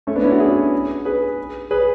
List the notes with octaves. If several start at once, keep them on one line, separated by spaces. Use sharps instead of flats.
A3 C#4
B3 D4
C#4 E4
D4 F#4
E4 G#4
G#4 B4
G#4 B4